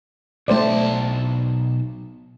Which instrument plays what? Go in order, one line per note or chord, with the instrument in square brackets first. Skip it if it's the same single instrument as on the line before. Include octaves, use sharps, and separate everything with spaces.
[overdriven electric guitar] B1 A5 [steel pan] A3 C5 D5